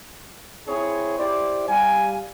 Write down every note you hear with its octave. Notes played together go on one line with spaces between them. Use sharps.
C4 E4 G#4 C#5
E4 G4 C5 D5
G3 F5 G#5